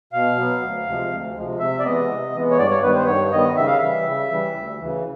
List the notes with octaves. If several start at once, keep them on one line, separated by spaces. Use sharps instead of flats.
B2 F5
F#3 B3
D2
C3 F3 G#3
D2
C3 F3 G#3
C3 E5
D5
E3 G#3 B3 D#5
C3
E3 G#3 B3
C#5
G2 D5
C#5
D#3 G3 B3 B4
C5
G2 C#5
D#3 G3 B3 D#5
C#3 E5
F5
E3 G3 E5
C#3
E3 G3
D2
C#3 E3